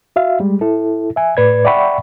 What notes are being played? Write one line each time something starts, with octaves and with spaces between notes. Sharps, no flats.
F#4 E5 F5
G3 G#3
E4 A4
E5 G#5
A2 B4 D5 G#6
D5 E5 F#5 G5 B5 C#6